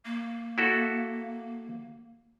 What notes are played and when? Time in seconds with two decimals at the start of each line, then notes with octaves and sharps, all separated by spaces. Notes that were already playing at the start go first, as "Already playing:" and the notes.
0.05 A#3
0.58 E4 F#4 A4